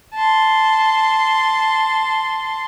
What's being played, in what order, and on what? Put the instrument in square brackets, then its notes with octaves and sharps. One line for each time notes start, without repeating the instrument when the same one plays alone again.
[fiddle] A5 C6